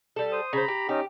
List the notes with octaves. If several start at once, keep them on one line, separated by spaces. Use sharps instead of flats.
G3 A4
C5 D#6
C#3 C5 A#5 B5
G4
C#4 D#4 G4